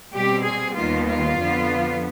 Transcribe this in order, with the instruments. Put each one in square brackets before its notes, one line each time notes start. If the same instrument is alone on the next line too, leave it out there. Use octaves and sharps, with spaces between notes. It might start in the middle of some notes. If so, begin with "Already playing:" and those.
[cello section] B2 G3 C4 G4
G#4
D#2 D#3 G3 B3 F4
F4
F2 D3 F3 B3